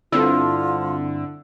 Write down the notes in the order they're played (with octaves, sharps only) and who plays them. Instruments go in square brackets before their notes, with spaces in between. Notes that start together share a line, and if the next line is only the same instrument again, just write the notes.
[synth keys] G2 C4 E4 [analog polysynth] D3 [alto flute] F4 [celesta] E6